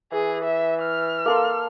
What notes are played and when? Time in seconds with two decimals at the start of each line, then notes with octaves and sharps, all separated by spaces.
0.12 E3 G#4
0.44 E5
0.83 F6
1.26 A#3 A4 C6